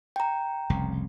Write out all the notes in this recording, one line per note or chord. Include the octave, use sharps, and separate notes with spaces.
G5 A#5
F1 C2 C#3